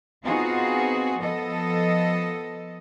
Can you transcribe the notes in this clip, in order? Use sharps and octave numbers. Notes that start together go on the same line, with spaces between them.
B3 C4 D#4 F4 F#4 G#4
F3 B3 A4 D#5